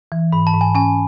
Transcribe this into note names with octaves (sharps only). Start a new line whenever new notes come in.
E3
G#2 B5
A5
G#2
G#5
C#4 G#5